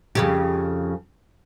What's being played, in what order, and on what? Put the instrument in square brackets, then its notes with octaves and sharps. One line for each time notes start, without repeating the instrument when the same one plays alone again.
[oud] F2 C#3 G4